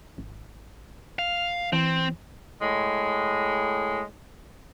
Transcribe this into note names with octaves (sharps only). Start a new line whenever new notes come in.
G#1
F5
E3 C4
A2 G#3